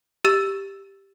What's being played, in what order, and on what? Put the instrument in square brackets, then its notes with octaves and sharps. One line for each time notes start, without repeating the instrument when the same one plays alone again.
[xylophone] G4 E6 A6 E7